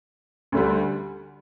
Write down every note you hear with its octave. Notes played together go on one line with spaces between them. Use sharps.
D2 D3 G3